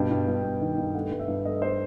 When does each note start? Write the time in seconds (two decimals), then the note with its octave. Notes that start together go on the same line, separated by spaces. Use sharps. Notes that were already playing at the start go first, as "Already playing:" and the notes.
Already playing: G2 B2 G5
0.11 G2
0.27 G2
0.44 G2
0.61 D#3
0.78 G2
0.94 A3 F#5
1.11 G2
1.19 E5
1.28 G2
1.45 A3 D#5
1.62 C5